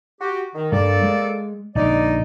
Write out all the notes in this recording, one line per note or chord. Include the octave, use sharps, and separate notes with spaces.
F#4 G4
D#3
G2 A#3 A4 D5
G#3
A#1 D3 D#4 D5